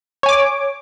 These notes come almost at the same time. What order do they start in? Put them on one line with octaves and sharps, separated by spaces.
C#5 G#5 D6